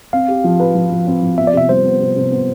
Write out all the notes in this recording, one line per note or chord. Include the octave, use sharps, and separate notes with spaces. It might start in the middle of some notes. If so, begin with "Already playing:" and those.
C4 F5
G4
F3
B4
F3
F3
C4
F3
B3 E5
D5
C3 E5
G3 C5
B3
C3
C3
B3